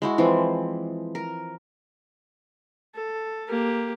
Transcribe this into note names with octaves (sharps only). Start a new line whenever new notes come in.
G#3 E4 F#4
E3 F3 C4
A#4
A4
A#3 G4